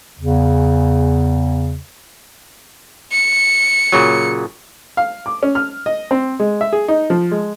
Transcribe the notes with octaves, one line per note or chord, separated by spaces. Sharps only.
E2 C#3
C#7
A#2 C#3 F#3
F5
D6
C#4
F6
D#5
C4
G#3
E5
G#4
D#4
F3
G#3